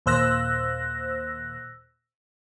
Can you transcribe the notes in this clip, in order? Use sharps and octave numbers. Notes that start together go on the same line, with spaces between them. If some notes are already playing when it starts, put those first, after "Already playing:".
D#2 A#2 C5 E6 F#6 A#6